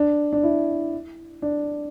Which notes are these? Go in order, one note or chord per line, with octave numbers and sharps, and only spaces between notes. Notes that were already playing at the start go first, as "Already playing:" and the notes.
Already playing: D4
D4
E4
D4